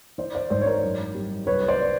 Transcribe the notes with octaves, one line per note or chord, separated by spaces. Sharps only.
E3 C5 D5
C5 D5
G#1 C5 D5
C#5
A#4 C5
F#2
G3
C2 B4 C#5
C5 D5